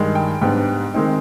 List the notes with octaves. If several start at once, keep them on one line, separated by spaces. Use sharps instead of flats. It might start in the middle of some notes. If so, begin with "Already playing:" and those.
Already playing: G2 D#3 G#3
G5
G#2 G3 B3 D4 G5
D#3 G#3 C4 D#4